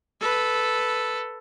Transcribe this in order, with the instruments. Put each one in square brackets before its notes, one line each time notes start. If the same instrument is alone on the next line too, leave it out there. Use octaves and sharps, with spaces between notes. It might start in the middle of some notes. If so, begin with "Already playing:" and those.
[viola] A4 B4